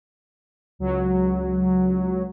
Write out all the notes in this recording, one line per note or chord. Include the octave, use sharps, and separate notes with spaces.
C#2 F#3